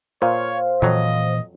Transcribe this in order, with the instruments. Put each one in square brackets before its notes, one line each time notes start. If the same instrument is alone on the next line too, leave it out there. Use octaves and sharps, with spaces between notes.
[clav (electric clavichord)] A#2 [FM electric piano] C5 F5 [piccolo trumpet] C#5
[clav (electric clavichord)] F2 F#3 [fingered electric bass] A#2 E3 [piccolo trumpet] D#5